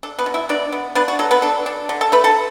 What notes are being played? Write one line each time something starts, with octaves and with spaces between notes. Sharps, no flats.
D4 A4
B3 B4
B2
E4 E5
B2 D4 D5
B3
B3 D4 B4
F#4
F#3 A4
B3 B4
D4 A4
D4
D3
A4 A5
A3 B4 B5
A4 A5